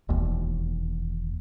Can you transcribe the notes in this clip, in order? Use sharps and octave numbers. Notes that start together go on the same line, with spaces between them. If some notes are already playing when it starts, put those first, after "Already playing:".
E1 D#2